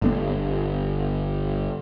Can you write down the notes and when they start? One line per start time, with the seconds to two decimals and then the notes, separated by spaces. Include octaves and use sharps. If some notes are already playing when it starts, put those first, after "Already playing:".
0.02 G1 D3 B3